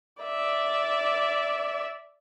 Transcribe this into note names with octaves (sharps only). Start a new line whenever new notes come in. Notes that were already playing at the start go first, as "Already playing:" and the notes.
D5 E5